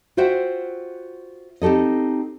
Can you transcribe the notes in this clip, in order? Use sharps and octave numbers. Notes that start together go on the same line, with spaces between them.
F4 F#4 C5 E5 F#5 G5
C4 D#4 G4 A4 D#5